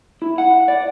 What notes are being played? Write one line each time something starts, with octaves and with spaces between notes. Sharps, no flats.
E4
F#5
D5